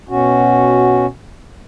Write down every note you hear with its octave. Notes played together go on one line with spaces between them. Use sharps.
B2 C#4 F#4